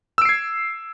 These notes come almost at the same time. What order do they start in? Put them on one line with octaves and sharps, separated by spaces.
E6 D7 C7 G#6